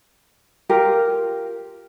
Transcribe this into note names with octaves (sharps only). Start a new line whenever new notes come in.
F4 G4 A#4